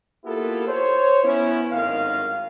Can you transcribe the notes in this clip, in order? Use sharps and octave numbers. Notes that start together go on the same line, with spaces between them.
A#3 B3 E4 F4 G4 A4
C5 C#5
B3 C#4 E4
G#1 F#2 A2 D#3 F5